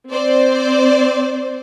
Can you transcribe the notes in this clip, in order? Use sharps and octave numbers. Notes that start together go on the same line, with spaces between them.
C4 C5 D5